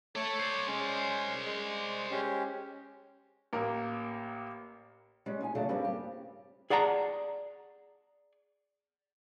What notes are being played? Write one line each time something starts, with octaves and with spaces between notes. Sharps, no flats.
A3 A4 C#5 D6
C5 D5
G#3 C#4
G#3
G#3 C#4 G4
A1 A#3 A#4
G3 G#3 C#4
C#4 D#4 G#5
E2 C#3 F#3 A3 D4
G2 G3 A#3 C4 C#4
G4
G#4 D5 F#5 A5 A#5